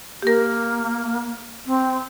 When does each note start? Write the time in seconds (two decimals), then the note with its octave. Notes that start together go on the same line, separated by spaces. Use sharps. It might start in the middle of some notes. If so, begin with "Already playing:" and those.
0.22 A#3 G4 A#4
1.66 C4